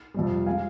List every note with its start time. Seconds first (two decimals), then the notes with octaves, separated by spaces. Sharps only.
0.14 F2 C3 G3
0.46 F3 G#3 F5 G#5